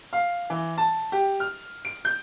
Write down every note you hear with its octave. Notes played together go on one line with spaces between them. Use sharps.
F5
E3
A5
G4
F6
D7
G6